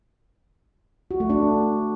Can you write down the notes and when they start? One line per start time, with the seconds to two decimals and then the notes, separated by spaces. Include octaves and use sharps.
1.11 F#4
1.20 A3
1.30 D4